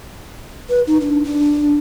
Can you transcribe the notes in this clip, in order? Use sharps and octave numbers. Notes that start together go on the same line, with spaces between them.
B4
D#4
D4
D4